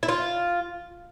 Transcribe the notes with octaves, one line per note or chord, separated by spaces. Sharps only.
E4
F4